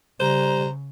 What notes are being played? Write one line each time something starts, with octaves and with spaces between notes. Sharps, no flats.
C#3 G3 C5 A#5